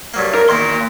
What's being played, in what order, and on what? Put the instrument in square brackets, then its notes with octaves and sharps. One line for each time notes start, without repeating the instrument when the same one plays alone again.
[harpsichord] G2 F#3 A#3
[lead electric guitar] A#4
[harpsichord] E2 D#3 [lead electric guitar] A#3 C6